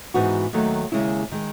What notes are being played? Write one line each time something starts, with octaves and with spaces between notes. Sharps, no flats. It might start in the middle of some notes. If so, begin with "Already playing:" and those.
G#2 E3 B3 D#4 F#4
D#2 D#3 F#3 A3
D#2 C#3 G#3 C#4 E4
D#3 G#3